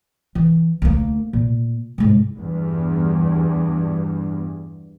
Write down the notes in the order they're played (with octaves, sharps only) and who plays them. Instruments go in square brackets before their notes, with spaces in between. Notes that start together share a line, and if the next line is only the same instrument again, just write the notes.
[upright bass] E3
D2 A#3
A#2
C2 G#2
[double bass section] E2 G2